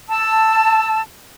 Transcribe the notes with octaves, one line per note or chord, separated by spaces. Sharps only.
A5 E6